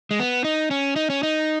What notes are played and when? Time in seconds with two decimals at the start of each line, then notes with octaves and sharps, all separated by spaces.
0.11 G#3
0.20 B3
0.44 D#4
0.71 C#4
0.96 D#4
1.10 C#4
1.23 D#4